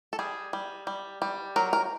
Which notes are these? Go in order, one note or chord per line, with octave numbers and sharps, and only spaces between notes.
A4
G3 G#4
G3
G3
G3
F#3 A#4
A#4